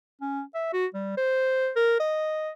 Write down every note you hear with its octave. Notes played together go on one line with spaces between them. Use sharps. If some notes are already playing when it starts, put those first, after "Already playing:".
C#4
E5
F#4
G3
C5
A#4
D#5